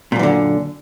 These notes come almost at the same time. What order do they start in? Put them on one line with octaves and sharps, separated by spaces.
A#2 F#2 E3 D3